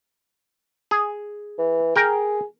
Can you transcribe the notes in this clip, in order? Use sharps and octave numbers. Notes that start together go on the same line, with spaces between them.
G#4
E3
G#4 A#4 G5